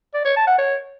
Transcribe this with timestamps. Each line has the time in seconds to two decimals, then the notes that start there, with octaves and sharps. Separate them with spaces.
0.14 D5
0.25 C#5
0.36 A5
0.47 F#5
0.58 C#5